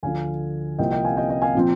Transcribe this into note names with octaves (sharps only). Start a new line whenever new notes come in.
D2 D3 F3 F5 G#5
C2 C3 F3 A#3 D#5 G5
D#5 G5
F5 G#5
D#5 G5
D#5 G5
F5 G#5
A#2 F3 C4